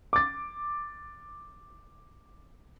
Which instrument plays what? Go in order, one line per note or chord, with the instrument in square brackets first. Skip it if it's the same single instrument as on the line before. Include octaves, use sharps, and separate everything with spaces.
[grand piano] D6 A6